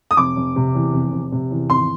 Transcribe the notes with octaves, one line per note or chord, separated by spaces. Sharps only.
D#6
F1 D6
F1
C3
E2
F1
F1
C3
E2
G#1 C6